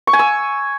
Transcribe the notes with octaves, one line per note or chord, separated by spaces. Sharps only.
C#6
G#5
E6